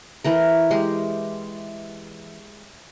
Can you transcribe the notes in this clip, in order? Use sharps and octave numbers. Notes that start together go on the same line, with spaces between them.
E3 A3 A#4
G#3 G4